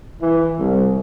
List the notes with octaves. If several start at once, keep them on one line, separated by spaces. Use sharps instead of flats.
E3
C2